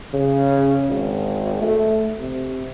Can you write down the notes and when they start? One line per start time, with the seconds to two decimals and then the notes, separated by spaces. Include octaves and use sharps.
0.13 C#3
0.89 G#1
1.62 A3
2.19 C3